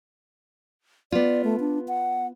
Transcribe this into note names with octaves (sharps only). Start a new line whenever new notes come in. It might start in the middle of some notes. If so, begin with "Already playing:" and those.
B3 F4 D5
A3
D4
F#5